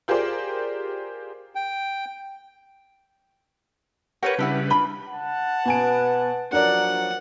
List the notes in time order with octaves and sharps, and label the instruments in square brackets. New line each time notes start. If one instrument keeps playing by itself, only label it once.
[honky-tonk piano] F4 G4 G#4 A#4 C5 D5
[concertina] G5
[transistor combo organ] G4 A#4 C#6 [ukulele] B4 C#5 F#5
[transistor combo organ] C#3 G3 B4 [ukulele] D4 E4 F#5
[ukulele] D4 F4 B5
[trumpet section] F#5 A5
[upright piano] B2 G#5 D7 [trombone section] B3 B4
[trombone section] F3 F#3 [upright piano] D4 A#4 D5 [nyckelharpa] F#5